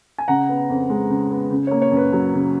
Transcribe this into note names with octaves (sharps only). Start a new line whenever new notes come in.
G#5
C#3 F#5 A#5
B3
F2
G#3
C#3
B3
C#3
C#5
A#3
C#5
F#2
B4
F#3
C#3